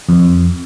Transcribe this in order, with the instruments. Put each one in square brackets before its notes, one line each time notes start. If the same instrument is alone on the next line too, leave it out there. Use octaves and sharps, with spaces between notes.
[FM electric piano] F2